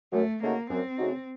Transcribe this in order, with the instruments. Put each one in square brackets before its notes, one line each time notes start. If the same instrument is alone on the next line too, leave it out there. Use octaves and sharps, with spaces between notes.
[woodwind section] F#2 [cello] A3
[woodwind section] C#3 A3 D#4 F#4 [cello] A#3
[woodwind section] F#2 [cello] C4
[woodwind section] C#3 A3 D#4 F#4